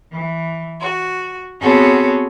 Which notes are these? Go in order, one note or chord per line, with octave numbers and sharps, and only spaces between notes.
E3
F#4
B3 C4 F#4 G#4 A4 C#5